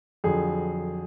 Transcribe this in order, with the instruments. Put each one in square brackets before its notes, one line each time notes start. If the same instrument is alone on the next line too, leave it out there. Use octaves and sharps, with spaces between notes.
[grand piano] F2 D3 F#3 G#4